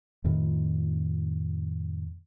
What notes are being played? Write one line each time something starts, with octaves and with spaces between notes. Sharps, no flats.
F2 A2 D#3